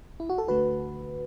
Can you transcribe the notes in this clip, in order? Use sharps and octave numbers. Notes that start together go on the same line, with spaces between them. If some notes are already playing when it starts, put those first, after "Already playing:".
E4
F#4
A4
D2 D3 A3 F#4 B4